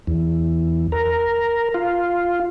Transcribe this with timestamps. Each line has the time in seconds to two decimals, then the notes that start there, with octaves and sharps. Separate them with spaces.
0.07 E2
0.92 A#4
1.74 F4